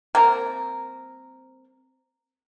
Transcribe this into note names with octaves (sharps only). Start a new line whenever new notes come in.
G3 A#3 C4 A#4